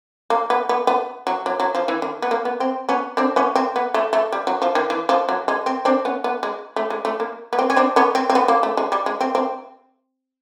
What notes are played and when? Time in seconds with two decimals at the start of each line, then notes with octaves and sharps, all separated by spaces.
0.30 A#3
0.50 B3
0.69 B3
0.87 B3
1.27 F#3
1.46 F#3
1.60 F#3
1.75 F3
1.88 E3
2.02 D#3
2.22 B3
2.31 A#3
2.45 B3
2.60 C4
2.89 B3 C#4
3.17 C4 D4
3.36 B3 C#4
3.55 C4
3.76 B3
3.94 A3
4.13 A3
4.32 G3
4.47 F#3
4.62 F3
4.75 D#3
4.90 E3
5.09 F3
5.29 F#3
5.48 G#3
5.66 C4
5.85 C4 D4
6.05 B3 C#4
6.24 B3
6.43 G#3
6.76 A3
6.90 G#3
7.05 A3
7.20 A#3
7.53 B3
7.59 C4
7.70 C#4
7.76 C4 D4
7.96 B3 C#4
8.15 C4
8.30 C4
8.35 B3
8.48 A#3
8.63 A3
8.77 G#3
8.92 G3
9.06 G#3
9.21 C4
9.35 C4